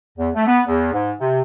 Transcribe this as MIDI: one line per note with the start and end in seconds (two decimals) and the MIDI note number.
0.19 0.29 40
0.34 0.44 57
0.47 0.61 59
0.67 0.91 40
0.93 1.13 44
1.20 1.42 48